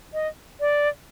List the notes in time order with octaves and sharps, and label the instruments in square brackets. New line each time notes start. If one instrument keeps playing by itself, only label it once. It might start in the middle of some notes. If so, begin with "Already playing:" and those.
[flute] D#5
D5